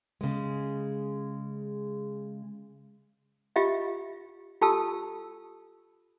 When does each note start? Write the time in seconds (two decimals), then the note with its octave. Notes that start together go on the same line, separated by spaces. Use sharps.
0.21 C#3 G#3
3.56 F4 G4 D#5 E5
4.61 F4 G4 A4 A5 E6